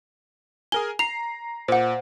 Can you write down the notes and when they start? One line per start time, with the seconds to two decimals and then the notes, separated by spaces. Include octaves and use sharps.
0.72 G#4 A#4 G#5 G7
0.99 A#5 C7 F7
1.68 A#2 C5 F#5